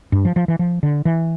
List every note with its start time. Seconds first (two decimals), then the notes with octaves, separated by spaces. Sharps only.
0.12 G2
0.25 F3
0.36 F3
0.48 E3
0.59 F3
0.83 D3
1.05 E3